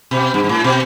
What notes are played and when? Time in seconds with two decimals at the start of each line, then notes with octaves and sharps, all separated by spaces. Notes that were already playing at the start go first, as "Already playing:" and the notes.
0.11 B2
0.34 G2
0.44 G2
0.49 A2
0.64 B2